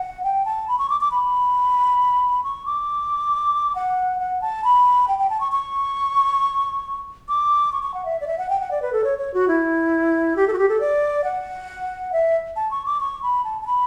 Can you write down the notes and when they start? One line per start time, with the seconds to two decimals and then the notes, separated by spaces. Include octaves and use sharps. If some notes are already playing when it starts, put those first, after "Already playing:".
Already playing: F#5
0.24 G5
0.45 A5
0.68 B5
0.78 C#6
0.90 D6
1.01 D6
1.11 B5
2.44 C#6
2.66 D6
3.75 F#5
4.20 F#5
4.42 A5
4.64 B5
5.08 G5
5.19 G5
5.30 A5
5.40 C#6
5.52 C#6
7.28 D6
7.72 C#6
7.83 C#6
7.94 F#5
8.05 E5
8.21 D5
8.27 E5
8.38 F#5
8.49 G5
8.60 F#5
8.71 D5
8.82 B4
8.93 A4
9.04 C#5
9.19 C#5
9.34 F#4
9.48 E4
10.36 G4
10.48 A4
10.53 F#4
10.58 G4
10.69 A4
10.80 D5
11.24 F#5
12.12 E5
12.56 A5
12.71 C#6
12.86 D6
13.01 C#6
13.23 B5
13.44 A5
13.62 A5
13.67 B5